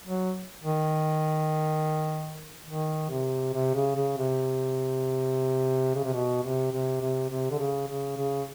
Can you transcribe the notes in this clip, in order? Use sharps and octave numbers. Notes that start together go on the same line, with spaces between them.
F#3
D#3
D#3
C3
C3
C#3
C#3
C3
C#3
C3
B2
C3
C3
C3
C3
D3
C#3
C#3
C#3